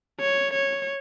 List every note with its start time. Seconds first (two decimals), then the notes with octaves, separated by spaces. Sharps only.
0.20 C#5
0.54 C#5